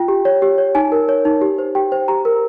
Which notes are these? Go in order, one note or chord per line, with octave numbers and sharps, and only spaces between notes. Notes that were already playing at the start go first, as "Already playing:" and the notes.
Already playing: F4 G5
G4
C#5
G4
C#5
D#4 G#5
A#4
C#5
D#4
G4
C5
G4 G5
C5
G4 A#5
A#4